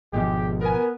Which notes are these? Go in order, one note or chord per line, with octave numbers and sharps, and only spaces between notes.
G#1 B2 F3 G#3 G4
B3 A#4 G#5